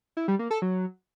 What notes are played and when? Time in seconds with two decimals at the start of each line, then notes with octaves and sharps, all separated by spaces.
0.17 E4
0.28 G3
0.39 A#3
0.51 A4
0.62 F#3